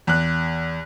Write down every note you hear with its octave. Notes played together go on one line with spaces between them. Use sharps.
E2 F#6